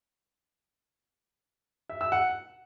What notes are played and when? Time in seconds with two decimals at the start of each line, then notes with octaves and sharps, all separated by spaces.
1.90 E5
2.01 E6
2.12 F#5